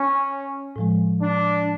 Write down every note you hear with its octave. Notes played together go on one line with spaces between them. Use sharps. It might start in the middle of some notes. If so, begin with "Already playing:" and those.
Already playing: C#4
A2 F3 G#3
D4